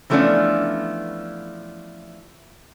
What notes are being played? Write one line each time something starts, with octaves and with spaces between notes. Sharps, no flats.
E3 F3 A3 B3 C#4 D4